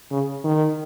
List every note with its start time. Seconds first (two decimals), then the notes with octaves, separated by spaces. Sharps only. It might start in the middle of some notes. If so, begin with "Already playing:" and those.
0.11 C#3
0.44 D#3